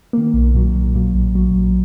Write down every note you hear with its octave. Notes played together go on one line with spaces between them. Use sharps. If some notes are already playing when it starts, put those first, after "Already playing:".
D#3 A#3
B1
A#2 F#3
B1
A#2 F#3
A#1
A#2 F#3
A#1